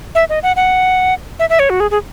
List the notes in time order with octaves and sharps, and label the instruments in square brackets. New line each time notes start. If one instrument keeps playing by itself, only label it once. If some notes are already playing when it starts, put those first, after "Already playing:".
[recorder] E5
D#5
F#5
F#5
E5
E5
C#5
F#4
G#4
G#4